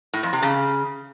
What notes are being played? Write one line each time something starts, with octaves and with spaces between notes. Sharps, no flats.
A2
F2
C3
C#3